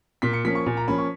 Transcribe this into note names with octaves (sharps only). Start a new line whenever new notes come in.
A#2 B6
C#7
F3 A#3 C#4 B6
C#6
A#2 G#5
A#5
F3 A#3 C#4 B5
C#6